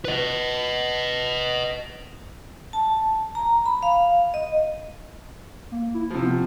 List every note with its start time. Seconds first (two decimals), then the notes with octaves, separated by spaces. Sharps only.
0.05 B4 D#5
2.73 A5
3.35 A#5
3.66 B5
3.83 F5
4.34 D#5
5.72 A#3
5.94 E4
6.11 C3 F3
6.25 B3